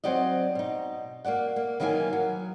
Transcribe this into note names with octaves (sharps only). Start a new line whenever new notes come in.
F#3 C4 F#4 D5 D#5
B2 D#4
A#3 F#4 D5 F#5
A#3
D#3 E3 F#3 A#3 D#5 G#5
F#3